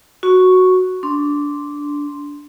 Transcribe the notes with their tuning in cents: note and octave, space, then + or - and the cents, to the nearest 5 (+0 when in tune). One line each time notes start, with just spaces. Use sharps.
F#4 +0 C#6 +0
D4 -15 C6 +0